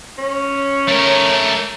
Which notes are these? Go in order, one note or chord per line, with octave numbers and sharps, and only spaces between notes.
C#4
A3 A#4